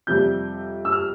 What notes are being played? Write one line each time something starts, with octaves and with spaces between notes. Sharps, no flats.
F2 C3 G3 G6
E6
F6